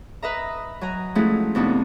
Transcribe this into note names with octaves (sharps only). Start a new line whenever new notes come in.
B4 D#5 E5 A#5
F#3 G#5 A#5
F3 G#3 A3 C#4 E4 F#4
F2 C3 B3 D4 D#4